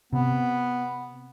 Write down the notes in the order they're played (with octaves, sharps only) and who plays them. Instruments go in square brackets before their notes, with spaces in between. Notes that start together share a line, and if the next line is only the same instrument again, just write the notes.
[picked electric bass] C3 [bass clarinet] B3